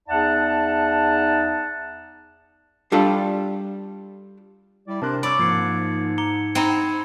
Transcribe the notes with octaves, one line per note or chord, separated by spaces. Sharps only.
E2 D#4 D5 E5 F#5 A5
G3 D4 F4 G4 A4
G3 E4 D5
C3 D4 A#4 C5 A5 F#6
C#5 D5 B5 D6 E6
G#2 F3 A#3 G#6 C7 C#7
A#5 D6 C#7 G7
C4 D#4 A#5 B5 G#6